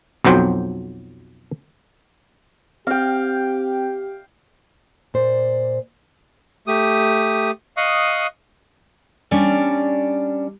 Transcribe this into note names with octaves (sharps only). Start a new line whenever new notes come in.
B1 F2 F#3 C5 G5
C4 G4 F5 G5
A#2 C5 D5
A3 G4 D#6
D#5 F5 C#6 D#6 F#6
G3 C#4 D4 D5